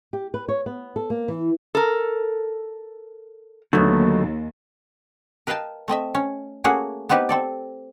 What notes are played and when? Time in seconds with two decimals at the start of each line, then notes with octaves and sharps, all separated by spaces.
0.13 G4
0.34 B4
0.48 C#5
0.66 B3
0.96 A4
1.10 A#3
1.28 E3
1.75 A4 A#4
3.73 D#2 D3 F#3 A3 B3
5.47 A#4 B4 D#5 F5 G5 A5
5.88 A3 C4 D#5 E5
6.15 C#4
6.64 A3 A#3 C#4 F#4 G#4 F#5
7.09 B3 C4 D#4 G4 B4
7.29 C4 A4 D5